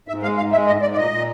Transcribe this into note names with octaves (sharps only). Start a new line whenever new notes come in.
G#2 E5
G#3 F5
G#2 F5
G#3 E5
G#2 D#5
G#2 D5
D5
A#2 D#5
A#2